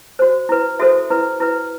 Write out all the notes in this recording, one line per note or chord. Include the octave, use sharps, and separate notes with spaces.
F#4 C5
E4 B4
F#4 A4 C5 E5
E4 B4
E4 B4